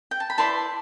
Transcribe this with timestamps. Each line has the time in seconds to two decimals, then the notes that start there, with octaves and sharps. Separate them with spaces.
0.11 G5
0.20 A5
0.30 B5
0.38 E4 B4 D5 A5 C6